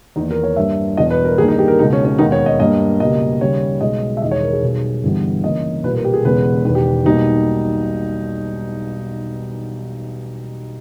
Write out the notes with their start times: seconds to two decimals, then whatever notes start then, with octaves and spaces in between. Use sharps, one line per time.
0.16 E2 D#3 A#3 D#4
0.31 A#4
0.43 C#5
0.56 G2 G3 A#3 E5
0.97 E1 E2 B2 D#5
1.10 B4
1.25 A#4
1.38 G2 D#3 A#3 G#4
1.48 D#4
1.59 G4
1.68 A#4
1.79 C#2 B2 G#3 D#4
1.93 C#4
2.05 C#4
2.19 E1 D#2 D#3 G#3 B3 D#4
2.32 C#5
2.46 D#5
2.60 G2 G3 A#3 D#5
3.00 C#2 B2 G3 A#3 D#5
3.41 D#2 C#3 G3 C#5
3.81 B1 B2 G#3 D#5
4.17 E5
4.22 E1 E2 D#3 G#3 D#5
4.31 C#5
4.43 A#4
4.53 G#4
4.62 B1 B2 G3
5.03 G1 G2 E3 G3 B3
5.44 C#2 C#3 E3 A#3 D#5
5.83 B1 A#2 G3 B4
5.95 A#4
6.04 G4
6.14 G#4
6.24 E1 E2 C#3 G#3 B3 B4
6.64 E1 E2 D#3 B4
6.75 G4
7.05 B1 B2 G3 A#3 D#4